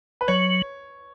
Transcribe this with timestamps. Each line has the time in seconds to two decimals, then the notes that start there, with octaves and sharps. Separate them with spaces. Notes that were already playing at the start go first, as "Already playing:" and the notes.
0.21 B4
0.28 F#3 C#5